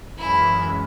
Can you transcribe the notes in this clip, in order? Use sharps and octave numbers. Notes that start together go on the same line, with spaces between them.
F#2 E3 G#3 C#4 E4